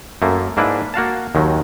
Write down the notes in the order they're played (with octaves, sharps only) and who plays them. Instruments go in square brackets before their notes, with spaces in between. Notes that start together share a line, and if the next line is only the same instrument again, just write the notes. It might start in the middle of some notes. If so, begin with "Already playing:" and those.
[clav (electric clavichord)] F#2 A3 A#3
G#2 A#3 D4 E4 B4
A#3 F#4 F5 A5
D#2 D#3 F#3